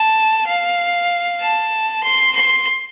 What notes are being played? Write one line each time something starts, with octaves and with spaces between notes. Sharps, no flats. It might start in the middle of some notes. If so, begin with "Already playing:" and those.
Already playing: A5
F5
A5
C6
C6